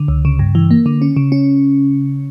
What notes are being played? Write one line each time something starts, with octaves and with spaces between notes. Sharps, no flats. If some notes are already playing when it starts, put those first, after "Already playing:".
Already playing: D3
C#2
C#3
G2
E3
A#3
D3
C#4
C#3
C#4